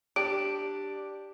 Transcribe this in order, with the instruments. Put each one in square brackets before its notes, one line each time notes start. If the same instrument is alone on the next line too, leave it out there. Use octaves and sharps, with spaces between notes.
[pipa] D4 [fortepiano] G4 [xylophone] D7